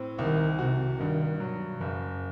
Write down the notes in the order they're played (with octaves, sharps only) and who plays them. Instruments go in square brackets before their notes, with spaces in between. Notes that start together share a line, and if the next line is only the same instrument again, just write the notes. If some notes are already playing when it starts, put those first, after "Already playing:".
Already playing: [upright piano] A2 C4
[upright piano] C2 [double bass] D#3
[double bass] C3 [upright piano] F#4
[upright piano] G2 [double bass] D#3
[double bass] B2 [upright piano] F#3
[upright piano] F#1 [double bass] F#2